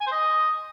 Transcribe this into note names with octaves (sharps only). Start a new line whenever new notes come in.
G#5
C5
D#5